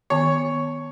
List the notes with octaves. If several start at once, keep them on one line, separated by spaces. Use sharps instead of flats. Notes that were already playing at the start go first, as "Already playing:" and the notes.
D#3 B3 C#5 A5